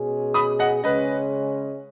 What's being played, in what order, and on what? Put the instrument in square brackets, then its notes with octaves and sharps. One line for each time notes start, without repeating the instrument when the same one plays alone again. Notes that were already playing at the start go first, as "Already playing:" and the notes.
Already playing: [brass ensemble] B2 G#3 C#4 G#4
[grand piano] B5 D#6
D#5 F#5
[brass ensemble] C#3 G#3 C#4 [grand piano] B4 D#5